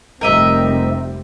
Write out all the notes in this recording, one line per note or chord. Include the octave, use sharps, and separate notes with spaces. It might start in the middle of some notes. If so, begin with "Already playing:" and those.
F1 G3 C4 A#4 D#5 E5